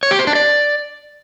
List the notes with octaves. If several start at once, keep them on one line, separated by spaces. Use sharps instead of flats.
C#5
G4
C5
D4
D5